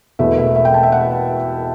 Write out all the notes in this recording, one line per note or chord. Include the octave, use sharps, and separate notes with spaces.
E1 E2 B2 A3 E5
E5
E5
G5
A5
E5
F#5